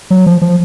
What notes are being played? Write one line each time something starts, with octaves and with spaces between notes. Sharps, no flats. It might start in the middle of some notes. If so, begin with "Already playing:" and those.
F#3
F3
F3